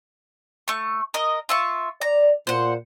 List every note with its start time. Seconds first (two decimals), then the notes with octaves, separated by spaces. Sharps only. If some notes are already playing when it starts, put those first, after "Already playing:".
0.68 A3 C#6
1.14 A#4 D#5
1.49 F4 E5 C#6
2.01 D5 A#5
2.47 A#2 C5 F#5